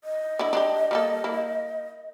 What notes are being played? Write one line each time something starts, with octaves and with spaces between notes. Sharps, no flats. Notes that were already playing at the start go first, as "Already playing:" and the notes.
D#5
D3 E4
D4 E4 G4
G3 A#3 A4
A#3 E4